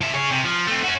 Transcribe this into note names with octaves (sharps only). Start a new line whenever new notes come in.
F3 E5
G#4 C#5
C3
F3
A3 C4
C#4 F#4